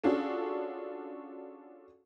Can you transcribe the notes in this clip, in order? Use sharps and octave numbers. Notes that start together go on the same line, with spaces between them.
C#4 D4 F4 F#4 G#4 A4